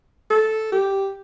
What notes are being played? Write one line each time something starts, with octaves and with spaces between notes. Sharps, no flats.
A4
G4